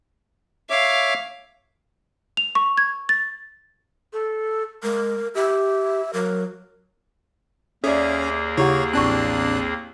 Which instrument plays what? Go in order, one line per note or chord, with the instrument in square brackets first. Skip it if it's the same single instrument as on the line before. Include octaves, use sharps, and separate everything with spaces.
[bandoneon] C#5 E5 D6 [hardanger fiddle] F5
[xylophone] F7
C#6
G#6
A6
[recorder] A4
[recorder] G#3 [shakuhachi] A#4
[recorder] G4 [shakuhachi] E5
[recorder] F#3 [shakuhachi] A#4
[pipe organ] D#2 A#3 G#4 [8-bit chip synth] C#4 [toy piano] A4 D5 [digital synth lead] E5
[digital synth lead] C#3 [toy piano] E4 G4 F#5 [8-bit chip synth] C#5
[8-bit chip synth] A1 D4 F#6 [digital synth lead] C4 [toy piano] A5 C#6